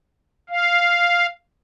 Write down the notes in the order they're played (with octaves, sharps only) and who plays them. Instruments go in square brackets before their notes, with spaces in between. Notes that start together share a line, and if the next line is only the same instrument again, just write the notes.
[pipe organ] F5